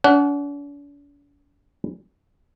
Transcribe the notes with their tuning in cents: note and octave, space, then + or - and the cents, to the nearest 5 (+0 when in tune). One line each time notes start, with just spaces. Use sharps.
D4 -45 F#5 +15